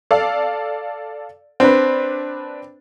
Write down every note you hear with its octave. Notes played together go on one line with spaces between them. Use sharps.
A4 D5 F5
C4 D4 B4